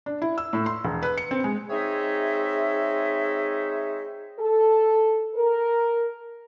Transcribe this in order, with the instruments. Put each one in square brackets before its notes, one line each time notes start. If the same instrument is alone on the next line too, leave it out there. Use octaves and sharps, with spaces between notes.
[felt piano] D4
E4
E6
A2
C6
E1
B4
C#7
C4
G#3
[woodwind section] G#3 C4 D#4 G#4 C#5 E5
[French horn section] A4
A#4